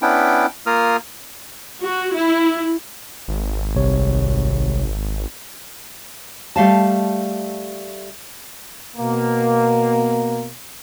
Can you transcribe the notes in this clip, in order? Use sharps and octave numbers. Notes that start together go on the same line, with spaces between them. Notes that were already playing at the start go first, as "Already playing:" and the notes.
B3 C#4 D4 E4 G5
A#3 F4 A#4 D#6 F6
F#4
E4
G#1
C2 C3 C#5
G3 A3 F5 A5
B2 A#3